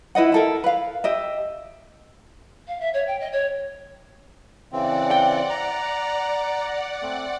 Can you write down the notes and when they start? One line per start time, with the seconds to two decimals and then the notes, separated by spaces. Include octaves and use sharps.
0.15 E4 B4 D#5 F#5
0.32 E4 A4 A#4
0.64 B4 F5
1.04 G4 D#5 E5
2.67 F5
2.80 E5
2.94 C#5
3.07 G5
3.20 D#5
3.32 C#5
4.72 C#3 E3 C4 D5 F#5
5.11 G5
5.50 A#5
7.02 A3 C4